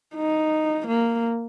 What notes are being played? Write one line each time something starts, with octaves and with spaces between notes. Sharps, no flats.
D#4
A#3